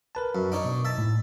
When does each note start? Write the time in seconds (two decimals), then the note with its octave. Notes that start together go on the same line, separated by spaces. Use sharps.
0.15 A#4 B4 A5
0.35 F#2
0.52 D4 D#4 C#5
0.65 B2
0.85 E5 A5
0.98 A2